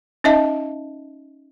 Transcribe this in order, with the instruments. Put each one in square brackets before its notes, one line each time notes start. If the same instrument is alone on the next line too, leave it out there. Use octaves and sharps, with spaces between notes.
[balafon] C#4 D#4 D#5 E5 A5